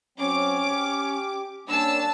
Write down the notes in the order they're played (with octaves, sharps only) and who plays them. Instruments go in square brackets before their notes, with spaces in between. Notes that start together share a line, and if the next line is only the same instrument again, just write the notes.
[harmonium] F#3 C4 [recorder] C#4 [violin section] D6
[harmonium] G4
[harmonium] G3 A#3 C#4 [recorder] D4 [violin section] A5 E6